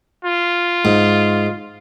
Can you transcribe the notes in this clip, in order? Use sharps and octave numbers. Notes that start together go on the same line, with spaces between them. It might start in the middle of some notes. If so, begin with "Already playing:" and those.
F4
G#2